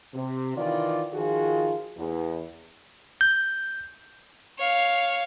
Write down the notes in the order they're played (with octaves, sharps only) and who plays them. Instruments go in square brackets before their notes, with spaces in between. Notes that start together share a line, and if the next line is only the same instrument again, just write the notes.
[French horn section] C3
D#3 E3 F4 D5
D#3 F3 F4 F#4 G#4
E2
[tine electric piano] G6
[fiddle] C#5 F5